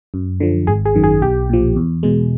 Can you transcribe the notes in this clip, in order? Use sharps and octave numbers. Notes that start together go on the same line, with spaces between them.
F#2
D3 F3
G#1 G#4
G#4
F#2 D#3
G#4
B1 G4
A#2 F3
E2
B2 G#3